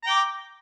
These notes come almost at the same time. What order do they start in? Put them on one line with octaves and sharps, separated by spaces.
A#5 G5 D6